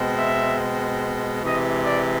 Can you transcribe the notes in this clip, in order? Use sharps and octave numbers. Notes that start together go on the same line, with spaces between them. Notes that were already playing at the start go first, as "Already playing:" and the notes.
Already playing: B2 G#3 C4
E5
C3 E3 G#3 D#5
D5